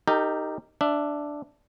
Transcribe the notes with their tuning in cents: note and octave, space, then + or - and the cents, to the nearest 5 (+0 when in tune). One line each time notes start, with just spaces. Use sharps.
D#4 +0 G4 +0 A#4 -35
D4 +0 E5 +15